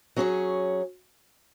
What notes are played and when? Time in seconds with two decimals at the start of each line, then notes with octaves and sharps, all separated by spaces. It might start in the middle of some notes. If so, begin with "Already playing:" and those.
0.16 F#3 C#4 G#4 C#5